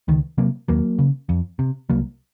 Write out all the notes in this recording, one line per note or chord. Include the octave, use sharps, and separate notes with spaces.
C#2 D#3
C3 F#3 A#3
D#2 F#3 A#3
C#3
F2
C3
C2 F#3 A#3